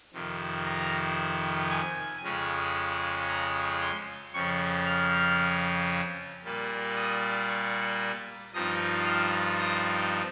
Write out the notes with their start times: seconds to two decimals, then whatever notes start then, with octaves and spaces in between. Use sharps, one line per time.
0.13 F2 C3 D#3
0.65 A#5
1.70 G#5
2.23 F2 C#3 G#3 C#4
3.28 A#5
3.81 C6
4.33 F2 C#3 F3 C#6
4.86 F6
6.44 A#2 G3 A#3
6.96 D#6
7.49 C#6
8.54 G2 F3 C4 D#4 D#6
9.06 F6
9.59 D#6